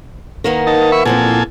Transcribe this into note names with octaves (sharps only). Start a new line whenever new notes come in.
D#3 A#3 B3
D#4 A5
E5 B5 C#6
E2 A#2 F3 C4 A4 G#5